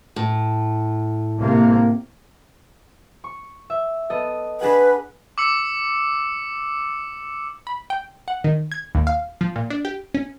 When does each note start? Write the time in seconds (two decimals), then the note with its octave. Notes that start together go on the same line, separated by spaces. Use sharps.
0.16 A2
1.40 C3 A#3
3.24 C#6
3.70 E5
4.10 B3 A4 D#5
4.61 D4 G#4 B4 F#5
5.38 D6 E6 C#7
7.67 B5
7.90 G5
8.28 F#5
8.44 D#3
8.72 G#6
8.95 D#2
9.07 F5
9.41 F3
9.56 A#2
9.70 D4
9.85 G4
10.14 C#4